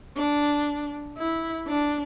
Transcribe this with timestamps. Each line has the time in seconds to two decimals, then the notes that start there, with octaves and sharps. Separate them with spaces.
0.17 D4
1.18 E4
1.67 D4